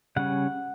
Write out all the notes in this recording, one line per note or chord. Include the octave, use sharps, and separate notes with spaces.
C#3 G3 C#4 F#5